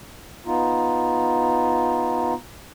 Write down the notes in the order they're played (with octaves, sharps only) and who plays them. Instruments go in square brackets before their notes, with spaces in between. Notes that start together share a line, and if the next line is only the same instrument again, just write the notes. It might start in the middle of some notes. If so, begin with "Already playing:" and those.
[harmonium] B3 D#4 F4